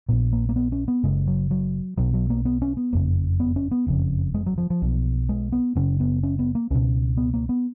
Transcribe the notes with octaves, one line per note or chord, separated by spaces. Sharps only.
A#1 A#2 B3
A#3
A#3
B3
C#4
B3
F#1 F#2 C#3 G#3
F#3
F#3
B1 B2 F#3
F#3
A#3
B3
C#4
B3
F#1 F2 C#3 A#3
B3
C#4
B3
F#1 F2 C#3
G#3
F#3
F3
F3
B1 B2
G#3
B3
F#1 F#2 C#3 C#4
B3
C#4
B3
A#3
C#2 B2 C#4
B3
A#3
B3